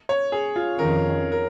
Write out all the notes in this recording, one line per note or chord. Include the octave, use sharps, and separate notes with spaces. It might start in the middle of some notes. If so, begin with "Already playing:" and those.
C#5
G#4
F4
F2 D#3 C#4 A#4
A#4